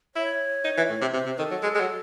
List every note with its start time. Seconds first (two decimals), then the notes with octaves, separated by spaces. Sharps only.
0.15 E4 C#5
0.64 D#4
0.77 E3
0.89 A2
1.01 C3
1.14 C3 C5
1.26 C3
1.38 D#3 A4
1.51 F#3
1.63 G#3
1.75 G#3
1.81 F#3